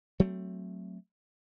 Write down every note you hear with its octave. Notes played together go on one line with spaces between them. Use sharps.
F#3 A3 C4